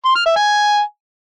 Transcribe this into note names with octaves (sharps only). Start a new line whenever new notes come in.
C6
F6
E5
G#5